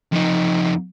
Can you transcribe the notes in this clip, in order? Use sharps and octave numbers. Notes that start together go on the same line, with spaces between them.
F2 D#4